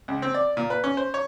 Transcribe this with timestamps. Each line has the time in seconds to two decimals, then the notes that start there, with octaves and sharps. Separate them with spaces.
0.08 C#2
0.22 C4
0.34 D5
0.57 A#2
0.70 B4
0.84 C#4
0.97 C5
1.14 C#5